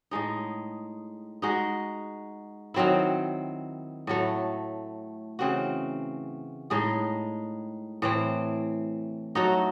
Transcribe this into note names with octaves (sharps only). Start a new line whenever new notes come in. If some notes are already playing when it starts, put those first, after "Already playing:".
A2 G#3 D#4
G#3 D#4 F#4
D#3 F#3 C4 E4
A2 F#3 A3
C#3 E3 C4 F#4
A2 G#3 D#4 G#4
A2 E3 C4
F#3 A3 D#4 F#4